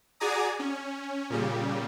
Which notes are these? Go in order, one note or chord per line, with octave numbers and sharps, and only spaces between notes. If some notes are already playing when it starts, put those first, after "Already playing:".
F#4 G#4 D5 G#5 A#5 D#6
C#4
A#2 C#3 G3